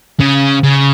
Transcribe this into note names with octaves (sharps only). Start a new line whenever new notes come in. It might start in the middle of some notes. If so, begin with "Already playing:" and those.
C#3
C#3